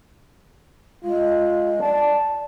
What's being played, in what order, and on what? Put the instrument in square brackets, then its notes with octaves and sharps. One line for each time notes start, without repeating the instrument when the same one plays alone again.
[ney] G#3 [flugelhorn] F4
[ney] D5 [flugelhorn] A5